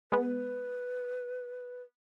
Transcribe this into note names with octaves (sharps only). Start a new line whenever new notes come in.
G#3 B3 B4